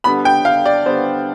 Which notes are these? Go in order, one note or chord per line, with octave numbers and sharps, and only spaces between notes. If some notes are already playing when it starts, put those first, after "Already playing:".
D3 G3 B3 B5
G5
F5
D5
D3 G3 B3 C5